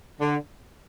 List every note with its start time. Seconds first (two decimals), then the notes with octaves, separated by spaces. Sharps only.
0.20 D3